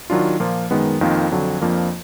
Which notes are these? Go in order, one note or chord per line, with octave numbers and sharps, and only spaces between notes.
D#3 F#3 D4 F4
A#2 F3 A#3 F4
F#2 D#3 G#3 B3
F2 D#3 A#3 F4
F2 D3 F#3
F2 F3 A#3 D4 F4